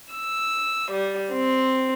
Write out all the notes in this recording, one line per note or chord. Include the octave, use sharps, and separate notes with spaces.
E6
G3
C4